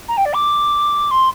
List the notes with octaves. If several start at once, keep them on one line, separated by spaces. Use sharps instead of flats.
A#5
G5
D5
D6
C6